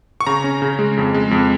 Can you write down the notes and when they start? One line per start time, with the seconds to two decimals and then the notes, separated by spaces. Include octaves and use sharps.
0.21 C#6
0.27 C#3 A#5
0.44 C#4
0.62 C#3
0.79 G#3
0.97 F2
1.14 G#3
1.31 F2